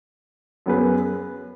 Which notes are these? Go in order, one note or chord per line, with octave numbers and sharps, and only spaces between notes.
F#2 F#3 B3 G#4 B4